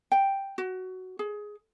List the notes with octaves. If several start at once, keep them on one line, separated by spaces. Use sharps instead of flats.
G5
F#4
G#4